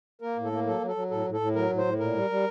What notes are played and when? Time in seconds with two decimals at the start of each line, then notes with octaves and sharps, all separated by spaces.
0.21 A#3 A#4
0.37 A2
0.44 A4
0.52 A#3
0.67 F#3 A4
0.81 F#3
0.88 A4
0.96 F#3
1.11 A2 A4
1.26 A2
1.33 A4
1.40 A2
1.55 F#3 A#4
1.70 A2
1.78 C5
1.85 A2
1.99 A#2 A#4
2.14 G3
2.30 G3